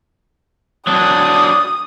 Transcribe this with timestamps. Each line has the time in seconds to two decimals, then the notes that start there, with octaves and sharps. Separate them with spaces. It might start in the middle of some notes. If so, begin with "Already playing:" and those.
0.87 F#3 D4 D#6